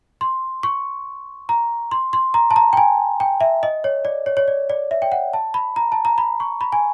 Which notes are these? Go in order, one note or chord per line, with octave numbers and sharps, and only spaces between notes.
C6
C#6
A#5
C6
C6
A#5
A5
A#5
G5
G#5
G5
E5
D#5
C#5
D5
C#5
C#5
D5
D5
E5
G5
F#5
A5
B5
A#5
A5
A#5
B5
C#6
B5
G#5